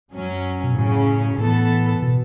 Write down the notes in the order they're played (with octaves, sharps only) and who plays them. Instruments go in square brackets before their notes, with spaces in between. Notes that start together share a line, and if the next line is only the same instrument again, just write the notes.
[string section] F#2 F#3 C#4
[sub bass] B2
[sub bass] A2 [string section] C#3 F#3 C#4
[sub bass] A2 [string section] E3 B3 A4
[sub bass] B2